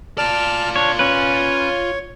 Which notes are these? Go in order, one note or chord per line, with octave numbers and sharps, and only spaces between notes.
F4 D5 A5 F6
D4 C#5
C#4 B4 C#5